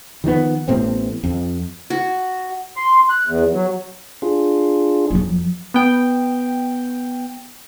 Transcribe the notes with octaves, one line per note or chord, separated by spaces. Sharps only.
D#3 F3 G3 B3
A1 A2 B3 C4
F2
F#4
C6
F#6
E2
F#3
D4 F4 G#4
F2 F#3
B3 G5